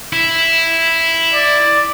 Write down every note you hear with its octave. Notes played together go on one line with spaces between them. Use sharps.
E4
D5